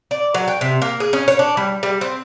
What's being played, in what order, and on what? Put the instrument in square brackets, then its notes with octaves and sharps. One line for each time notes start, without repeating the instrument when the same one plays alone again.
[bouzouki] D5
F#3
G5
C3
A#3
G#4
C#4
C#5
D4
G3
G3
C4